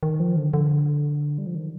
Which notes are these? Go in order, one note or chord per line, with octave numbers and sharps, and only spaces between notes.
D#3
F3
D3
D3
G3
F3
D#3